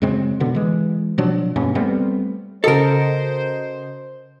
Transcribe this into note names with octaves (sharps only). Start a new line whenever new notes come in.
F#2 C#3 G#3 C4
B2 D3 B3
E3 G#3
B2 F3 F#3 D4
G2 B2 A#3 C#4
G3 A3 B3 C4
C#3 F#4 A4 A#4 C5 D#5